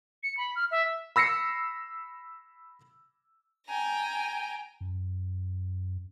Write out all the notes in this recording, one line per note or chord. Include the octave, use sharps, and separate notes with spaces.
C#7
B5
F6
E5
B5 E6 A#6 C7 C#7
G5 G#5 A#5
F#2